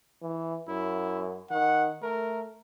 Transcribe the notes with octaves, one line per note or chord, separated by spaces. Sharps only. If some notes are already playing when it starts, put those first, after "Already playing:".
E3
F#2 E4
D#3 F#5
A3 A#4